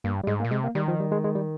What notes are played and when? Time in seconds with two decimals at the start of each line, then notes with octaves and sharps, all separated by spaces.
0.04 G2 A#3
0.24 G3
0.27 G#2 G#3
0.40 A#3
0.44 A#2
0.51 C3 G#3
0.64 A#3
0.75 D#3 G3
0.88 F3
1.00 G3
1.12 G#3
1.24 G#3
1.35 G3